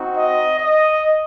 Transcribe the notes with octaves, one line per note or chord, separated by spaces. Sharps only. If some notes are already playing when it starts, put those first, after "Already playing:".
Already playing: C4 D#4 F#4
D#5
D#5